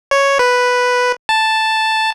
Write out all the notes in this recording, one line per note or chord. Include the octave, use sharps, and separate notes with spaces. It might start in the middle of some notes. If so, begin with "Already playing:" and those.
C#5
B4
A5